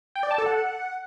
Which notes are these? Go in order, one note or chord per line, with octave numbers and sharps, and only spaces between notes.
G5
D5
A5
A4
F#5